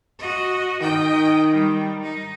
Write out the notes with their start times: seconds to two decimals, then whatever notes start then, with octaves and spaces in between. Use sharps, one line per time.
0.19 F#4 D#5
0.81 D#3 D#5 G5
1.50 G3
2.02 D#4